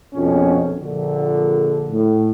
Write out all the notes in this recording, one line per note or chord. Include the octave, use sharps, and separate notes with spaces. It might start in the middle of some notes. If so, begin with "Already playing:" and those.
A#1 F2 B2 C#4
A#1 D3
A2